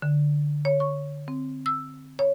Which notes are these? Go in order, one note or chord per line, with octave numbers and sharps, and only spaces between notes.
D3
C#5
C#6
C4
E6
C#5